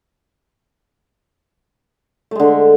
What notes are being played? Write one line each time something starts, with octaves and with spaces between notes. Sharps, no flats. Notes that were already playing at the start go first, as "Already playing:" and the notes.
D3 G#3 A3